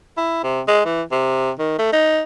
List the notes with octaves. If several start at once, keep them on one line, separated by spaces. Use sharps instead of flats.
E4
C3
G#3
E3
C3
D#3
A3
D#4